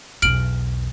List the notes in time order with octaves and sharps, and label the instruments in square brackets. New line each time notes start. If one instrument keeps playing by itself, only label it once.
[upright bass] B1 E2 [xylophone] F6 D7 F#7